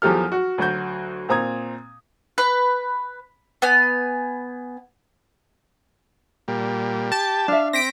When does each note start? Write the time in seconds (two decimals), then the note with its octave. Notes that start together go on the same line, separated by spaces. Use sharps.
0.02 E2 F3 F#3 G4 A4 F6
0.32 F#4
0.58 D2 F#3 F#4 G6
1.29 A#2 C4 A#5 D#6 G#6
2.38 B4
3.62 B3 G#5
6.48 A#2 G3
7.12 G4 A5
7.48 D4 E5 F5
7.73 C4 A#6 B6 D7